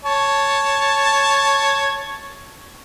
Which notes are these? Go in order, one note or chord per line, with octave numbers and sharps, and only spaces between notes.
C#5 A5